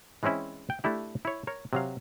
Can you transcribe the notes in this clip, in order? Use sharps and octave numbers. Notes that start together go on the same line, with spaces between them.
E3 G#3 C4 C#4 E4
G5
A3 D4 E4 G4
E4 C#5
A#4 C#5
C3 F#3 F5